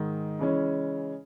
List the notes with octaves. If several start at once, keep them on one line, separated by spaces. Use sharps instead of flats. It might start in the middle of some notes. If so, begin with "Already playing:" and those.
Already playing: G#2 D#3 G#3
C#3 E3 G#3 C#4